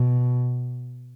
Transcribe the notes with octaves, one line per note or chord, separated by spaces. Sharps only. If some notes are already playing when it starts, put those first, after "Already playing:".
Already playing: B2